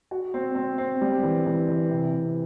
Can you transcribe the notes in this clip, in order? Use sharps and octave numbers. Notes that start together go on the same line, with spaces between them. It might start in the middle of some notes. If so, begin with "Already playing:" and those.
F#4
C4
C4
C4
G3
E3
E3
E3
C3
C3